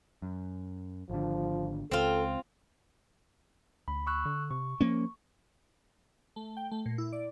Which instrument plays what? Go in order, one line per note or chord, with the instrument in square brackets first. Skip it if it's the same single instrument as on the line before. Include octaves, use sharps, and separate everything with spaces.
[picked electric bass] F#2
[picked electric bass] G#1 D3 [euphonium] F3
[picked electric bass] C#2 [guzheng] C4 F4 [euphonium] A4
[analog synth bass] D2 [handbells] B5
[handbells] C#6 E6 F#6
[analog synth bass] D3
[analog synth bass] C3 [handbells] C#6
[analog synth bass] F3 [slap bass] A#3 C#4
[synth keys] A3
G5
A3
A#2
E4
D5